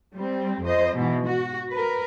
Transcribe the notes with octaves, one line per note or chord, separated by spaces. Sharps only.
G3 C4
F2 C5 D#5
G#2 B2 E3
F#4
A#4 B4